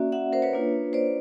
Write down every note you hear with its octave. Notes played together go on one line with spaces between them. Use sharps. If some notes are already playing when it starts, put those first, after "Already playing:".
Already playing: A#3 C#4 F#4 D5 E5
E5 F#5
A#4 C5
B4 C#5
A#3 D4 F4
C5 D5